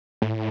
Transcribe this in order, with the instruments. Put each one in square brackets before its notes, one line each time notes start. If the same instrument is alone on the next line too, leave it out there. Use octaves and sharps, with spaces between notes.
[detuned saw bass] A2